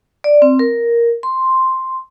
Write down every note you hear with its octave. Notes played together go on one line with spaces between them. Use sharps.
D5
C4
A#4
C6